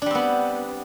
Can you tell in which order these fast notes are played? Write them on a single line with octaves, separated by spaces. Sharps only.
D4 G3 C4 B3